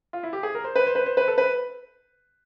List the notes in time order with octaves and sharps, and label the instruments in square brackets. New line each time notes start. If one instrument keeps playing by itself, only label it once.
[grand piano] F4
E4
G4
G#4
A#4
C5
B4
C5
B4
C5
B4
A4
B4